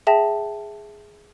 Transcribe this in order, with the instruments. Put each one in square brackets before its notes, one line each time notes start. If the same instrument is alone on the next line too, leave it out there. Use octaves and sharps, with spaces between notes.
[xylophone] G#4 E5 G5 A5 A#6